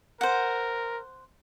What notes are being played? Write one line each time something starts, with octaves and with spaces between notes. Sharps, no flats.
A#4 C5 F#5